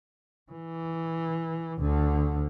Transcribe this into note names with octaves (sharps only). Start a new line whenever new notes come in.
E3
D2 D3